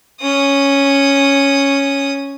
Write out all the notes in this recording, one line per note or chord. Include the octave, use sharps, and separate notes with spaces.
C#4 D#6